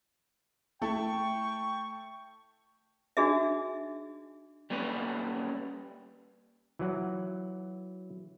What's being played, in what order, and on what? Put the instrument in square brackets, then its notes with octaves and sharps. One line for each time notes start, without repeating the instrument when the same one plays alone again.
[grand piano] A3 E4 A4 [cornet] G5 [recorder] C#6
[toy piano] D4 D#4 F#4 G#4 D#5 E5
[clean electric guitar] G3 A#3 C#4 B4 D5
[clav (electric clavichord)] E3 F#3 F#5